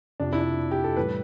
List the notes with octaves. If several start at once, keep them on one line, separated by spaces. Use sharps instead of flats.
F2 C3 F3 D4
E4
D4
G4
A4
A2 E3 G3 B4